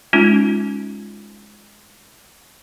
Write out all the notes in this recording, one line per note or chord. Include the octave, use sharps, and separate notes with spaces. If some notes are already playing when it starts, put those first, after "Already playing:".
G#3 C#4 D#4 F4